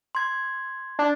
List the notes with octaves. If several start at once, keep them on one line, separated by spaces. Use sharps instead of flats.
C6 G#6
D4